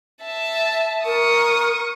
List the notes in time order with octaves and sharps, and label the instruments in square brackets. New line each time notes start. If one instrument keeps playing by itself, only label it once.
[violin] E5 A5
[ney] A#4 [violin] C#6 D#6